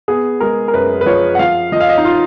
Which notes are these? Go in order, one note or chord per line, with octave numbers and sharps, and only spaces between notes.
B3 G#4
G#3 A#4
A#4
F#2 B4
B4
F3 C#5
F#5
F3 F5
F3 D#5
F5
D#5
D#4
F4